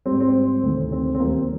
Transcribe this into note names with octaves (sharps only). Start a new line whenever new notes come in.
G#2 G3 C4
C4
D2 C3 D#3
C4
C4
D#2 D#3 G3 A#3
C4